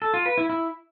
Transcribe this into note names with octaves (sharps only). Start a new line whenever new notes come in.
A4
F4
B4
E4
E4